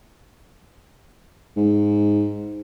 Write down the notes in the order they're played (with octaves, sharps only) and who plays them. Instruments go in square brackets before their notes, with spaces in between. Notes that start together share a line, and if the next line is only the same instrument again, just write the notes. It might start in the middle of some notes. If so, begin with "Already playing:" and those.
[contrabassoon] G#2